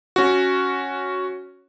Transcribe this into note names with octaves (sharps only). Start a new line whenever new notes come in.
C#4 F#4